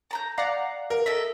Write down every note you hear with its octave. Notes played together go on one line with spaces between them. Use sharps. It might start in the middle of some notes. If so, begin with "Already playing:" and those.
A5 A#5 G6
D5 F5 F#5 A#5
A#4
A4 D#5 E5